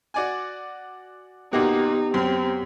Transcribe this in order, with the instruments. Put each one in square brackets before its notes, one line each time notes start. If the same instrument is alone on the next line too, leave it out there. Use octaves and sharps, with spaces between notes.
[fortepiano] F#4 D5 G#5
[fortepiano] A#2 A#3 F#4 [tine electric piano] B3 G4 [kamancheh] D#4
[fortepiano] F#2 F6 [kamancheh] C4